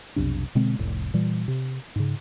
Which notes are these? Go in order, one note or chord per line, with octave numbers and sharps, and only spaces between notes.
B1 F2 C3 D4
B2 D3 G#3 C4
F1 C2 A2
A#2 E3 G3
C3
G#2 C#3